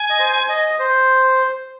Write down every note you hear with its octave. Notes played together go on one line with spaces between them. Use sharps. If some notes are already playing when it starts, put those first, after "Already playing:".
Already playing: G#5
D#5
C5
D#5
C5